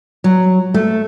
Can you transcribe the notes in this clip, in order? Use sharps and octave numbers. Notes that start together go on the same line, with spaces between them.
F#3
A3